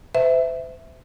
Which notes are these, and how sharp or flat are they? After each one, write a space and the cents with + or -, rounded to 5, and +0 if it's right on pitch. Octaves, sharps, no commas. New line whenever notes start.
C5 -40 E5 +0